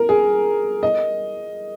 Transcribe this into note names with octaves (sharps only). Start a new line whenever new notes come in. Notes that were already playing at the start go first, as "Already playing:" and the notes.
Already playing: A#4
G#4
D#5